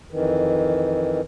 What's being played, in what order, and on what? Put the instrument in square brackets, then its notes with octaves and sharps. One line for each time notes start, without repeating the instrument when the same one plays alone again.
[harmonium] F2 D#3 E3